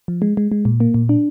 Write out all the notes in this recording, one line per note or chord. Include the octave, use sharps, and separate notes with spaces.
F3
G#3
G#3
G#3
A#2
A#3
A#2
D4